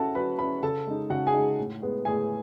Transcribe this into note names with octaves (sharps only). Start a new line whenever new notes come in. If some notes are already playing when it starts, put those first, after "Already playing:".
Already playing: C#4 E4 F#4 A4 F#5 A5
F#3 B4 B5
C#4 E4 B4 B5
C#3 A4 A5
G#3 D#4
C#3 F#4 F#5
G#4 G#5
G#3 D#4
A2
G#3 B3
A2 G#4 G#5